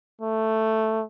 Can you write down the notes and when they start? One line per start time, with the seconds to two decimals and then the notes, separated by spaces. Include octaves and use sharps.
0.21 A3